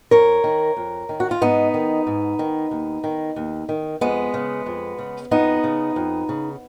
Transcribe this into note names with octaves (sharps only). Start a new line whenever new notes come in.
F2 A#4 C#5
D#3
F2
D#3
F#4
F4
G#2 B3 D#4
D#3
G#2
D#3
D#2
D#3
D#2
D#3
F2 G#3 B3
C#3
F2
C#3
F2 B3 D#4
C#3
F2
C#3